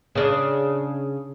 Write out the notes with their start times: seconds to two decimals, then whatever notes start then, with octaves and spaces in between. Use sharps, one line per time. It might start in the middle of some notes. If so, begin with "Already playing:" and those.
0.15 C#3 D4